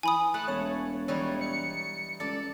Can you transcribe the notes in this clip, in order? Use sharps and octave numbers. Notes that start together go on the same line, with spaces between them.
E3 G#5 B5 D#6
A3 F#6
E1 C#5 A5
E3 G3 D#4 C#5
C#7
C#2 A4 D5